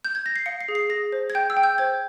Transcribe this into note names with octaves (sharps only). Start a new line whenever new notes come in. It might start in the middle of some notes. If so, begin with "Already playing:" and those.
G6
G#6
A#6
C7
F5 C#7
C7
G#4
C7
G#4 A#6
C5
G#6
G5 G6
E6
G5
G6
C5 G#6